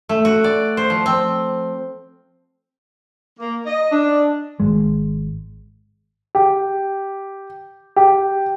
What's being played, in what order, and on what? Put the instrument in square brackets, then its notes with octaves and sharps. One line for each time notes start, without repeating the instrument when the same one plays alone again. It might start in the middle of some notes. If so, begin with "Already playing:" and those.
[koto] A3
F#4
D5
C5
F3
C4
[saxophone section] A#3
D#5
D4
[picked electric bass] G#1 G#3
[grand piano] G4
G4